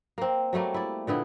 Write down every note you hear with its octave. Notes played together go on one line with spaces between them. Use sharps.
A#3 C4
F#3 G3 A3 A#3
E4 D5
A#2 D3 B3 E4